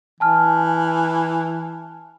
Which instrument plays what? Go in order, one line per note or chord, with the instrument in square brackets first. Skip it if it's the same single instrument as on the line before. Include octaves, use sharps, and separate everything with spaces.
[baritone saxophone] E3 [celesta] G#5 A5 F6